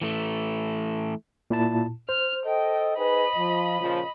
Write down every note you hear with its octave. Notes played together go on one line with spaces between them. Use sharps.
E3 A3
A#2 E4 A5
C5 F6
A4 D#5 G5
D#4 G#4 B4 D#5 B5
F3
A#2 C#3 F3